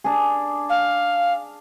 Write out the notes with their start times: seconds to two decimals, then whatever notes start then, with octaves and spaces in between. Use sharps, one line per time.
0.04 D4 G#4
0.69 F5